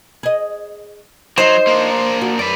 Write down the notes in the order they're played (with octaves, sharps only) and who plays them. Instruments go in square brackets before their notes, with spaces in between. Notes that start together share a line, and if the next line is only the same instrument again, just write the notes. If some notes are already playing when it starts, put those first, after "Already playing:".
[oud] G#4 D#5
[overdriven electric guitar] F#3 [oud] D#4 D#5 [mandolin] C5
[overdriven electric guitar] A#3 D4
[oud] F#4
[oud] F#2 [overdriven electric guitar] B4 D5